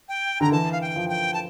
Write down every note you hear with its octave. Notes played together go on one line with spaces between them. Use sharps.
G5
D3 A#5
E3 A5
F5
G5
F3
G5
A5